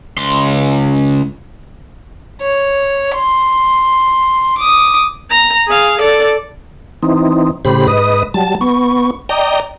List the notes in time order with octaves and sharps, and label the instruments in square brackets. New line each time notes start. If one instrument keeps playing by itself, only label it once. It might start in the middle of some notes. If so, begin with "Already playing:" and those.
[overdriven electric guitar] C#2 C6
[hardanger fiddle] C#5
C6
D6 D#6
[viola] A#5
G#4 F5
A4 D5
[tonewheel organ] E3 C4 D#4
A2 C#3 G4 C5 B5
G#2 B4 D#5 D#6
F#3 G3 A5
B3 C#6
D5 D#5 G5 A#5